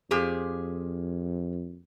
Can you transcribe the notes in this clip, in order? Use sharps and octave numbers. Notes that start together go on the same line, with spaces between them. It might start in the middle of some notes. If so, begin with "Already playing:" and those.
F2 F3 G4 G#4